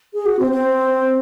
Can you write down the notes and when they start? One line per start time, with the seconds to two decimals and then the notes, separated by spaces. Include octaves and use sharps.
0.14 G#4
0.26 F#4
0.39 C4
0.51 C4